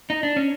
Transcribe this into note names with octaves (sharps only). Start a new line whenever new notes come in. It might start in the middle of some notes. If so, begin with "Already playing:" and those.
D#4
D4
C#4